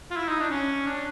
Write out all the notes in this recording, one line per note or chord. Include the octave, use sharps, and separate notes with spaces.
F4
E4
D#4
D4
C#4
D4